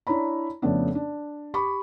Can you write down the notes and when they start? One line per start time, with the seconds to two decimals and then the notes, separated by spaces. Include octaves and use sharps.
0.07 D4 E4 C#5 A#5 B5
0.62 F2 C#3 A3 B3 D4
0.95 D4
1.54 G4 B5 C#6 D6